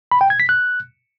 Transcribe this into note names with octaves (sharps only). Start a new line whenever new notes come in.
B5
G5
G#6
B6
F#6